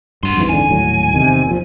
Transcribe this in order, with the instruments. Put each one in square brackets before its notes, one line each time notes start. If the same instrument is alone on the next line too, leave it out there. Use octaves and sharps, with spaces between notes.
[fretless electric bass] G2 [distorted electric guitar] F#4 C6
[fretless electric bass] F2 G#2 E3
[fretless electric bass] F2 G#2 D3 [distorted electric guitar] G#5
[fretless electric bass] D#1 A2 F#3
E2 C3 D#3
A#2 F3